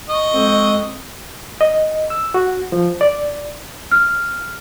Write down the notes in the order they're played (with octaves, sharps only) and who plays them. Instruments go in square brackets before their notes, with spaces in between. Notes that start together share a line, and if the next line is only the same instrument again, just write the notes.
[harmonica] D#5 C#6
[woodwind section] F2 G#3 C4
[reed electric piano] D#5
E6
F#4
F3
D5
[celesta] F6